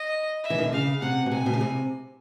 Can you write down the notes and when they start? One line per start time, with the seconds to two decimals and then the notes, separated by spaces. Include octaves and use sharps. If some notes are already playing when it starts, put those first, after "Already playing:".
Already playing: D#5
0.44 E5
0.50 E3
0.58 D#3
0.65 D3
0.73 C#3 F5
1.02 C3 F#5
1.26 B2
1.32 C3 G#5
1.46 B2
1.54 C#3
1.61 C3